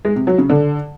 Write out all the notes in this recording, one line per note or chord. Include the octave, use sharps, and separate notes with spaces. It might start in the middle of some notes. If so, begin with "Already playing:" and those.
G#3
C3
F#3
C#3
D3